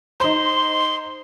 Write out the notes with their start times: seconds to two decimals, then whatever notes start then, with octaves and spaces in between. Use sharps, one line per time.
0.20 D#4 C5 C6